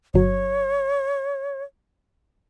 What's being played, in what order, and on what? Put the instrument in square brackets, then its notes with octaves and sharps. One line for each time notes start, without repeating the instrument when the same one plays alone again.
[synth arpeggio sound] G1 F#3 [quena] C#5